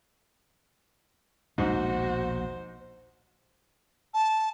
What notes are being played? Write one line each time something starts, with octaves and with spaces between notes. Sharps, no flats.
A#1 D#2 G#2 B2 F#4 C5
A5